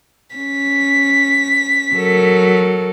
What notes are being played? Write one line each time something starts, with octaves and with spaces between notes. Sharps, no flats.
C#4 B6
F#3 A4 A#4